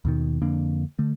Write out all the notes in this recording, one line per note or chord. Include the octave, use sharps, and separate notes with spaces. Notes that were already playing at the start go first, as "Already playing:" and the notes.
D#2 B2 D#3
F2 D3 A#3 D4
D3 A3